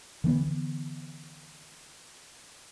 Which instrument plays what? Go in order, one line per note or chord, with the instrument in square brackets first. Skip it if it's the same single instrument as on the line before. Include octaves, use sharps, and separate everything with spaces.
[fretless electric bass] D3 E3 A#3 B3